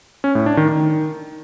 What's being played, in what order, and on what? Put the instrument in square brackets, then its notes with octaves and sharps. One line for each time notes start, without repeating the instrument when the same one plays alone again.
[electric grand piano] C#4
A2
D4
D#3
D#3